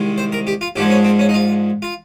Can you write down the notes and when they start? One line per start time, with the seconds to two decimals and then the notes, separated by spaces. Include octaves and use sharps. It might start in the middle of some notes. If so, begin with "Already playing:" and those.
Already playing: C2 C3 D#3 G#3
0.18 C5
0.32 A#4
0.47 G4
0.61 F4
0.76 A#1 G#2 F3 G#3 G4
0.90 C#4
1.05 C4
1.19 C#4
1.29 D#4
1.34 F4
1.82 F4